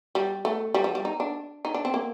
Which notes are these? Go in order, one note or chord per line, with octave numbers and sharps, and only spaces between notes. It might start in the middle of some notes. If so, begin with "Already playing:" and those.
G3
A3
G3
F3
G3
D#4
D4
D#4
D4
C4
A#3